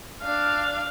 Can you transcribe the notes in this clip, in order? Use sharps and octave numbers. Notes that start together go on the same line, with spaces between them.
D4 F5